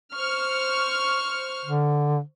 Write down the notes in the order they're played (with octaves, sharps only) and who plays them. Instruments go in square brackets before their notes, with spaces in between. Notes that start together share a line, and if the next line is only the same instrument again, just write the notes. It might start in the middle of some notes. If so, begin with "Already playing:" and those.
[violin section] C5 C#6 F6
[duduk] D3